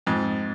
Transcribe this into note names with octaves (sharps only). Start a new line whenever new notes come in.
F2 G#2